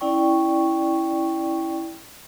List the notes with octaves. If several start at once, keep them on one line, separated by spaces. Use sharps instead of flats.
C#4 E4 D5 G5 C#6